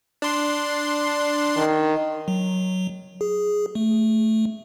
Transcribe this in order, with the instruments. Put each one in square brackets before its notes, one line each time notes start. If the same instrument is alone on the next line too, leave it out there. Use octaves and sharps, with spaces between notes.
[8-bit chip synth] D4 C6
[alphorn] D#3
[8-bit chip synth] F#3
G#4
A3